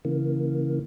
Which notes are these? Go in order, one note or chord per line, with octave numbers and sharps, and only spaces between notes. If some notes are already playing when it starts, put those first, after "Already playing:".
C#3 E3 A#3